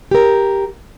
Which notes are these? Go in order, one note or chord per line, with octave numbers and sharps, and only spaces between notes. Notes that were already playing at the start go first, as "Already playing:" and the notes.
G4 A#4